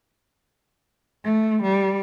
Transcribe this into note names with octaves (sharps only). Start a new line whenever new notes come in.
A3
G3